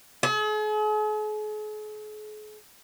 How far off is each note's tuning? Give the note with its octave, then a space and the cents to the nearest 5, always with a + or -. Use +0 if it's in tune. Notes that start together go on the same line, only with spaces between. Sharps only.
G#4 +45